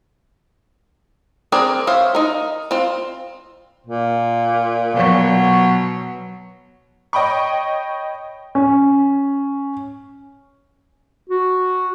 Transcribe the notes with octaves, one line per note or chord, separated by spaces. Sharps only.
C4 D4 G#4 A#4 D5
C5 C#5 E5 F5
D#4 A#4
C4 F4
A#2
B2 F#3
C#5 D#5 G5 B5 C#6
C#4
F#4